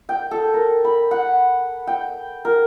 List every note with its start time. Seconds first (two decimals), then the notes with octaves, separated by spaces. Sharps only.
0.09 G5
0.31 A4
0.54 A#4
0.84 B5
1.11 F#5
1.87 G5
2.45 A#4